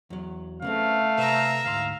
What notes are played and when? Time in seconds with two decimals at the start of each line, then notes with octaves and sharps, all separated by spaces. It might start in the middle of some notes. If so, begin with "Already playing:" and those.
0.10 E2 F#3
0.62 C#3 A3 B3 C4 F5
1.18 C3 B4 E5 A#5
1.65 D2 G#2 F5 C6